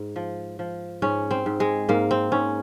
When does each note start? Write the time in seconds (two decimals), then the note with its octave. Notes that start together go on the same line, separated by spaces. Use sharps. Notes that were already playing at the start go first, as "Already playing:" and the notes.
Already playing: G#2
0.16 F3
0.59 F3
1.02 G#2 C#4
1.31 C4
1.46 G#2
1.60 G#3
1.89 G#2 A#3
2.11 C4
2.32 G#2 C#4